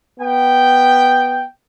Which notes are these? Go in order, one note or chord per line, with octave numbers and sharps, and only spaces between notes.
B3 G5